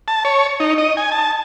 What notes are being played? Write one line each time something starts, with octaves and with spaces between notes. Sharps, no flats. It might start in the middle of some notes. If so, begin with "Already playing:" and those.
A5
C#5
D#4
D#5
G#5
A5